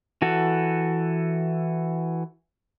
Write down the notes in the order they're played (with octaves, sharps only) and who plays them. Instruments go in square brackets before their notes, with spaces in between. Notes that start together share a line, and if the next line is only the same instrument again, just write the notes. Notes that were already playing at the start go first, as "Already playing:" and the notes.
[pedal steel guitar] E3 F#4 A4